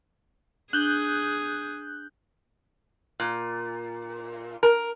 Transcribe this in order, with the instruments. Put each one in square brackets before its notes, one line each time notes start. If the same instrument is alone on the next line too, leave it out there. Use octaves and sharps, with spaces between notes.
[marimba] D4 [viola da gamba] G#4 [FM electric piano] F#6 G6
[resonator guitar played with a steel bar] A#2
A#4